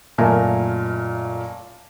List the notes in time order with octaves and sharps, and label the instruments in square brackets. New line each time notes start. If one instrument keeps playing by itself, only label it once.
[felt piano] F#1 A#2 A3 A#4 G#5